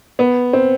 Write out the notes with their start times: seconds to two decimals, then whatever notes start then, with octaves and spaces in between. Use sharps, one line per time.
0.19 B3
0.53 C4